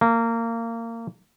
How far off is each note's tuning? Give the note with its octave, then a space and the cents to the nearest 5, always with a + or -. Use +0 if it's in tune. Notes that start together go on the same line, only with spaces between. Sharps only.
A#3 -25